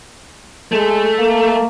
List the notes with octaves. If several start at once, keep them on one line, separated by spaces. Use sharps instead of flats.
G#3 A3
A#3